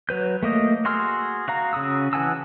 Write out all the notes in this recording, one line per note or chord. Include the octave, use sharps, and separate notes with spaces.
F#3 B4 G6
A3 A#3 D#5
F#4 G#4 C6 E6 F6
F#4 F5 A#5
C#3 F#4 D#6 E6
E3 F#5 G#5 A5 E6